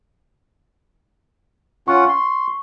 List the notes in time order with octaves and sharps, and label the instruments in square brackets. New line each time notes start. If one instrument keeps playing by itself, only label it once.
[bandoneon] C#4 F4 F#5 [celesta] C#6
[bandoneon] C6